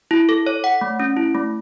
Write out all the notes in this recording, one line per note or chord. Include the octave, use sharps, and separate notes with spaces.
E4
A4
C#5
F#5
A3
C#4
E4
A3